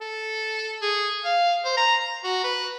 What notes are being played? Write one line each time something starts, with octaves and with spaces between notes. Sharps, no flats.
A4
G#4
F5
C5
A#5
A#5
F#4
B4